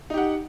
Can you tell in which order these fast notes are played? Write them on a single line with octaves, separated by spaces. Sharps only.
D#4 G4 F#5